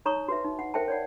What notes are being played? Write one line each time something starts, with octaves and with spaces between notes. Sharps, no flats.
D#4 C#5 A#5 C#6 D#6
F#4 B4 E5
D#4
F#5
A#4 C5 E5 G5 A5
C#5 D5 F#5